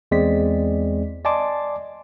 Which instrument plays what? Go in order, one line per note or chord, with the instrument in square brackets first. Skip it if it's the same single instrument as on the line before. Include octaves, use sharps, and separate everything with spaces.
[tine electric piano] E2 G#3 C4 D5 B6
D5 D#5 G#5 A5 C6 D6